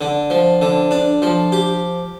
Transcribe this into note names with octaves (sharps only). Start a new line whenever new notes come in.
D3
F3
D3
D4
F3
G4